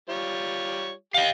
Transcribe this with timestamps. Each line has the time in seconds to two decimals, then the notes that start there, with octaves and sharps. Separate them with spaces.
0.10 G3 F4 C#5
1.14 G4 D#5 F5